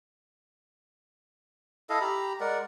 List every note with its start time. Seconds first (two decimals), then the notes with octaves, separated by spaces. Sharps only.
1.90 E4 A4 D#5 F5
2.01 G4 A#5 B5
2.40 G#3 A#4 D5 F#5